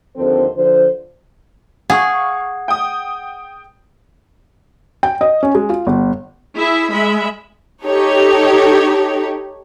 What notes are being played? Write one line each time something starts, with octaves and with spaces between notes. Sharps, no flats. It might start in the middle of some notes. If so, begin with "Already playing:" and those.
D#2 D3 F3 C4 A4 C5
D3 F3 F4 C5
G#4 F5 F#5 C#6
G5 D#6
G5
D#5
C#4
G#3
F4
G1
E4 G#4 E5
G#3 E5 B5
D#4 G4 A4 C#5